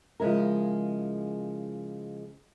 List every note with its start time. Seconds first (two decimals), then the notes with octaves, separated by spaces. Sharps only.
0.20 C#3 F3 G#3 E4 A#4